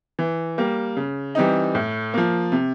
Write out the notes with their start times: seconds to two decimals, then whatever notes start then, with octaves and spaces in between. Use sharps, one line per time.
0.19 E3
0.58 G3 A#3
0.97 C#3
1.35 E3 G3 C4 D#4
1.75 A2
2.14 F3 A#3
2.52 C3